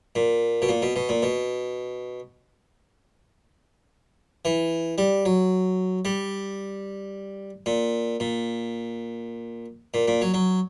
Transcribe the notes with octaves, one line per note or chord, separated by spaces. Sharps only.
A#2
B2
A#2
B2
B2
A#2
B2
E3
G3
F#3
G3
A#2
A#2
A#2
A#2
F#3
F#3